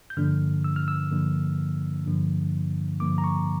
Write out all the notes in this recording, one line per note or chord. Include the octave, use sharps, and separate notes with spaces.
G6
G2 D3 F3 A#3 D4 F6
E6
F6
E6
G2 D3 F3 A#3 D4
G2 D3 F3 A#3 D4
G2 D3 F3 A#3 D4 D6
A#5
C#6